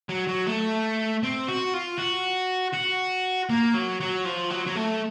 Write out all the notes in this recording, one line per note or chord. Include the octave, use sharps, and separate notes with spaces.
F#3
F#3
A3
C4
F#4
F4
F#4
F#4
A#3
F#3
F#3
F3
F#3
F#3
A3